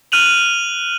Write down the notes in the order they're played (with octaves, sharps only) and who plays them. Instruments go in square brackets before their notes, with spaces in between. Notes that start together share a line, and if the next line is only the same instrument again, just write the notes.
[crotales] F6 F#6 D#7 F7 F#7